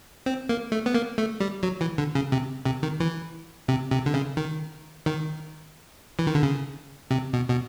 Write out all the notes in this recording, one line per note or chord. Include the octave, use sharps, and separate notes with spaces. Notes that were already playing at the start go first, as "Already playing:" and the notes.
C4
A#3
A3
B3
A#3
A3
G3
F#3
E3
D3
C#3
C3
C3
D#3
E3
C3
C3
D3
C#3
D#3
D#3
E3
D#3
D3
C#3
C3
B2
B2